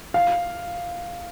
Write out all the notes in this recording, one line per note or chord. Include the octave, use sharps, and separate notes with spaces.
F5